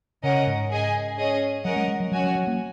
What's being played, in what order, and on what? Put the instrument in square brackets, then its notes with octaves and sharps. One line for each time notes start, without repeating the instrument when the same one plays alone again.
[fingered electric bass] C#3 [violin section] C#4 A#4 D#5 F#5
[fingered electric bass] G#2
[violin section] G#4 D#5 G#5
C#4 G#4 D#5
[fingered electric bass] F#3 [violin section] C#4 A#4 D#5 F#5
[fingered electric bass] G#3
G#3
F#3
[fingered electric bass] F#3 [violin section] C#4 F#4 C#5 G#5
[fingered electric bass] F#3
F#3
A#3